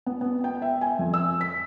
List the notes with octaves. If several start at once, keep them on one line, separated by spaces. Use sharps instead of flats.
B3
B3
G5
E5
G#5
F2
E6
B6